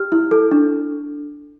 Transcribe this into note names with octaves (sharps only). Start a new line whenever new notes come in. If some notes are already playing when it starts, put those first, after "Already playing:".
Already playing: G4 F6
E4
A4
D4